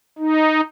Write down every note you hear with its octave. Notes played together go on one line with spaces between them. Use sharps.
D#4